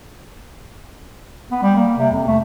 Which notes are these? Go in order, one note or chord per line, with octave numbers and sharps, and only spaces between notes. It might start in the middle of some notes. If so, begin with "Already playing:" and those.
B3
G3
A#3
C3
F2
A3